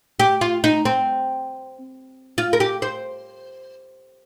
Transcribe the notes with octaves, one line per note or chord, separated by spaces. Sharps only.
G4
F4
D#4
C4
F4
A#4
G4
C5